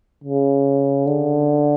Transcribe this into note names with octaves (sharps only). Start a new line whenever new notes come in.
C#3
D3